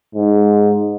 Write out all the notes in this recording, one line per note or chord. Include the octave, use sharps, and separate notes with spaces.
G#2